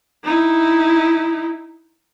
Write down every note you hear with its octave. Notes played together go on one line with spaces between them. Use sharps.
D#4 E4